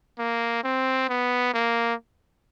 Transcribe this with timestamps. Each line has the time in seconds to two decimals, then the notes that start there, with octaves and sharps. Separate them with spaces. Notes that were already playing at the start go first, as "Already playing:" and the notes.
0.19 A#3
0.64 C4
1.09 B3
1.54 A#3